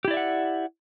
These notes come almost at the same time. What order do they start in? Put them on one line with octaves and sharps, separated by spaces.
G4 E4 D5 E5 F#5